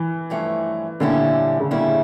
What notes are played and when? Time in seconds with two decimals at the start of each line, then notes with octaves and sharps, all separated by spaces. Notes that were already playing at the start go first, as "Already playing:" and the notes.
Already playing: E3
0.30 G2 F3 A3 C#4
1.00 A#2 D3 G3 C#4 E4
1.60 C#3
1.71 A#2 D3 G3 C#4 E4